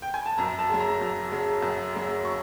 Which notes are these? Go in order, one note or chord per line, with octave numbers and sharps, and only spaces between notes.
G5
G#5
A5
F#2 A#5
A5
C#3 F#3
A#5
F#2
C#3 F#3
F#2
C#3 F#3
C#6